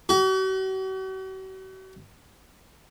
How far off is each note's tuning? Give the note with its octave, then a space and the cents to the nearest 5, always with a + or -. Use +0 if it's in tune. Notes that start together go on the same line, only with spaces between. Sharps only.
F#4 +45